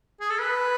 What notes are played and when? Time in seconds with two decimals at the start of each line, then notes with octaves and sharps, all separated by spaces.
0.21 G#4
0.30 A4
0.39 B4